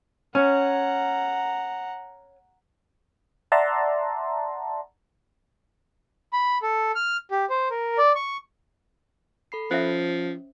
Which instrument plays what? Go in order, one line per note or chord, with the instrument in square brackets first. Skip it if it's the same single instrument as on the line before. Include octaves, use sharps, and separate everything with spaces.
[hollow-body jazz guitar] C#4 [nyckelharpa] F#5 A#5
[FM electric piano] D5 E5 F#5 A5 A#5 C6
[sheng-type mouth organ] B5
A4
F6
G4
C5
A#4
D5
C#6
[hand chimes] A4 B5 C7
[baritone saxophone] F3 [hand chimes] C#4 [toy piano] C5 E5